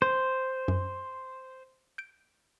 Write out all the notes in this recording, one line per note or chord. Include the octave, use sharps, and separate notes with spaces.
C5
F#2
G6 D7